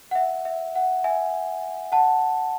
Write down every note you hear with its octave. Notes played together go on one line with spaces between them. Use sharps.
F#5
E5
E5
F#5
E5 G#5
F#5 A5